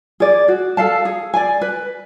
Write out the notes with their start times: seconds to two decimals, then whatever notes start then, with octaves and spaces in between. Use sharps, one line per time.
0.20 G#4 D5
0.48 F#4
0.77 A4 F5 A5
1.05 G#4
1.34 D5 G#5
1.61 B4